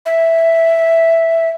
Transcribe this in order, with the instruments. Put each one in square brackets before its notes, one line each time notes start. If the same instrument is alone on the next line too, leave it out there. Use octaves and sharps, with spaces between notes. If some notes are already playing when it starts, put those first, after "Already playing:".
[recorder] E5